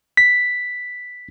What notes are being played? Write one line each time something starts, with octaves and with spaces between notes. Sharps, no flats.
B6